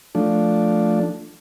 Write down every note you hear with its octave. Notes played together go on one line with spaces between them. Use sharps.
F3 A3 D4